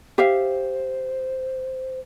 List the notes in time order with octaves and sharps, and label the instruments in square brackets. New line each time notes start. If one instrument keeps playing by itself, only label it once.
[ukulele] G4 E5 F5 [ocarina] C5